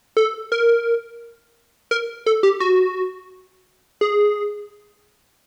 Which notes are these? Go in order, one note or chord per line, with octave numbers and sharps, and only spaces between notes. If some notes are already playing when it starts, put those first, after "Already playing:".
A4
A#4
A#4
A4
G4
F#4
G#4